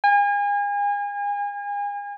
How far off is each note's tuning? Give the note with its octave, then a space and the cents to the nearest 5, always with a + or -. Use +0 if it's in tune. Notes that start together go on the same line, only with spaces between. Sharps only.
G#5 -35